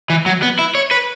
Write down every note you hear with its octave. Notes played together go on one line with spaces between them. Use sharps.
E3
F#3
B3
E4
C#5
B4